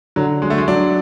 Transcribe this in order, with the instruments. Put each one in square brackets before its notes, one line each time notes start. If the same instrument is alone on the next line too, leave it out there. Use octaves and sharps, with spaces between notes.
[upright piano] D3 [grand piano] F#3
[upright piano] F#3 [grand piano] G#3
[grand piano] A3
G#3
[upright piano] F#3 [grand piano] D4